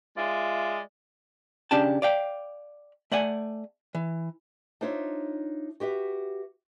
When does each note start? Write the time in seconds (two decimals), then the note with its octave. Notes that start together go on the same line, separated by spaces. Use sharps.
0.17 G#3 F4 D5 E5
1.71 C#3 C#4 D4 G4 G5 A5
2.02 D5 F5 G5
3.12 A3 D5 F#5 G#5
3.95 E3
4.81 D4 D#4 F4 C5 C#5 E5
5.80 F#4 G4 B4 E5